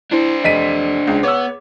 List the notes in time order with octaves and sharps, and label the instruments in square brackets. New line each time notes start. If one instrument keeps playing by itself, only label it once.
[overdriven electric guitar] D4 C5 [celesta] E4
[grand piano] F1 B6 D#7 [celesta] D#5
[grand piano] C#2
[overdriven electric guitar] B3 [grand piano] C#5 E6 [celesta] D6